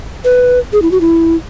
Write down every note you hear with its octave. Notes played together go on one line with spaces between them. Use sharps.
B4
G#4
E4
F#4
E4